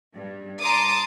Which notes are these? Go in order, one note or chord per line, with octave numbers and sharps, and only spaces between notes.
G2
A5 A#5 C6 D6 D#6